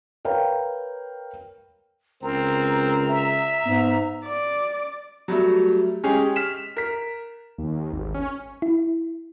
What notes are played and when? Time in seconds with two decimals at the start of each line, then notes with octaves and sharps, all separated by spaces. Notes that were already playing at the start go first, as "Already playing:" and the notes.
0.25 A#4 B4 C#5 F5 G5 A#5
2.23 C#2 C4 A#4 A#5
3.09 E5
3.66 G#2 B3
4.25 D5
5.28 F#3 G3 A3
6.04 G#3 C#4 G4 G#4
6.36 F6 B6 E7
6.77 A#4 B6
7.58 D#2
7.92 G#1
8.15 C#4
8.62 E4